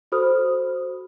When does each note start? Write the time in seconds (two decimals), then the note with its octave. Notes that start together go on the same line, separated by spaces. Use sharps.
0.12 F#4 A4 C5 B5 D#6 F6